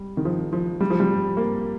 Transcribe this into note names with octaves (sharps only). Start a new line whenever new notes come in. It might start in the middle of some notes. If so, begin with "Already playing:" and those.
Already playing: G3
D#3
F3
F3
G3
F3
G3
A#3